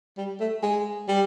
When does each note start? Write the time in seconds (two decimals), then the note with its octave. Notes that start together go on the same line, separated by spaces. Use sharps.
0.17 G3
0.40 A3
0.63 G#3
1.08 G3